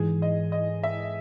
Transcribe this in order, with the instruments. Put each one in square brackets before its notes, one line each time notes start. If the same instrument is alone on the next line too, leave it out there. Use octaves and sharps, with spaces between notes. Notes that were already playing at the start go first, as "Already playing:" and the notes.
Already playing: [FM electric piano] G#2 E3 G#3 [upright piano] G#4
[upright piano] D#5
D#5
E5